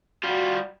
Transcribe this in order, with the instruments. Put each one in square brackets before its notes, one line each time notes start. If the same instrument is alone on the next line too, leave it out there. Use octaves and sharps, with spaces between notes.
[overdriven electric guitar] G3 F4 [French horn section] F#4